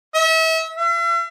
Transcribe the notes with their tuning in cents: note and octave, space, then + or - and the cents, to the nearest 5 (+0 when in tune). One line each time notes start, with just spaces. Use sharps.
E5 -35
E5 +45